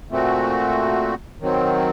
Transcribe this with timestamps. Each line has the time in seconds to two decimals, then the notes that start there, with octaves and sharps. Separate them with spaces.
0.10 A#2 A3 C4 F#4
1.40 D#3 F#3 C4